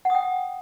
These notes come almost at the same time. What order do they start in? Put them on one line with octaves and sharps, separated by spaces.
F#5 D#6 G5